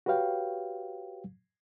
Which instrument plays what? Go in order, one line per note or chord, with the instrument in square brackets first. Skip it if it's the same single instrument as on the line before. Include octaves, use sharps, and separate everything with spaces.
[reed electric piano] F#4 G4 B4 C#5 F5 G5